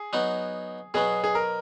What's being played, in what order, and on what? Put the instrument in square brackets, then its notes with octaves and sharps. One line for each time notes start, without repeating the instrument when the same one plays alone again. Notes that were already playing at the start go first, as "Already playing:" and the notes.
Already playing: [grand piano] G#4
[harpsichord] F#3 B3 D#4
[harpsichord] B2 F#3 B3 [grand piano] G#4
[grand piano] G#4
A#4